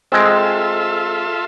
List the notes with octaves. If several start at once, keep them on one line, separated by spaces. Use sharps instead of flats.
G#3 C4 F4 A4 E5